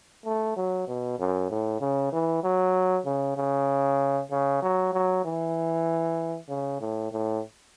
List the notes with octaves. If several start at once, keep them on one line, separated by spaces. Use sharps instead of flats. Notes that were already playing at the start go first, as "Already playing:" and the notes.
A3
F#3
B2
F#2
A2
C#3
E3
F#3
C#3
C#3
C#3
F#3
F#3
E3
C#3
A2
A2